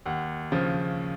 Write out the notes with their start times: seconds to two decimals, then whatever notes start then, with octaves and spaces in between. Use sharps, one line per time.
0.06 D#2 F#5
0.52 C#3 F3